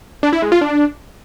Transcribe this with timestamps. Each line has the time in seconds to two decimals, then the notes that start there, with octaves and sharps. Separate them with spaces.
0.23 D4
0.33 E4
0.42 G#3
0.52 F4
0.61 D4